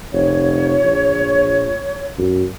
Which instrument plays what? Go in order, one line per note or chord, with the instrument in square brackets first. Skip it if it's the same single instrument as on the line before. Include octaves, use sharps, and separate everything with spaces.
[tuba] F1 [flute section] C#5
[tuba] A#1
F#2